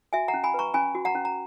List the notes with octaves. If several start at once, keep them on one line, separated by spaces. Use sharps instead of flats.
F#4 E5 G#5
F#5 A#5
C#4
G#5 B5
B4 A#5 C#6
C#4 G#5 B5
F#4
F#5 A#5
C#4
A#5